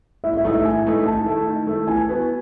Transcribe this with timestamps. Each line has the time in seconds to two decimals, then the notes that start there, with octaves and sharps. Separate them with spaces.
0.24 A2 E5
0.37 E5
0.44 E3 A3 D#4
0.52 E5
0.65 A2 G#5
0.85 E3 A3 D#4
1.05 D#3 A5
1.26 A3 E4
1.47 D#3
1.67 A3 E4
1.88 E3 G#5
2.09 B3 F#4